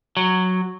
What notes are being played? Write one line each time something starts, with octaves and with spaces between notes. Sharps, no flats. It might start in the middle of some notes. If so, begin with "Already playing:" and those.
F#3